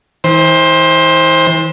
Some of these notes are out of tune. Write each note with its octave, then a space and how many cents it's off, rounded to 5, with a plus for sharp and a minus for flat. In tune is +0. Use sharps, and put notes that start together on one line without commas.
E3 -40 C5 +15